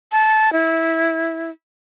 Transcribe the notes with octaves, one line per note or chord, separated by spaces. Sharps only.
A5
E4